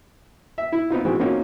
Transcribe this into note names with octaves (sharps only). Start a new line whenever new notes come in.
E5
E4
B3 C4 D#4 F4
E3 G#3 C4 F#4
A#3 C4 C#4 D#4 F4 F#4